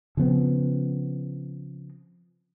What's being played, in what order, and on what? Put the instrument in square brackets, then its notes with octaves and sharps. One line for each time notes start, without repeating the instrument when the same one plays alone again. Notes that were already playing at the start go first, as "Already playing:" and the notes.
[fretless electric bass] C#3 F3 B3 C4